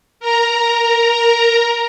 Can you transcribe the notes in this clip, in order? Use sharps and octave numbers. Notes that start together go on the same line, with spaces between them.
A#4 A#5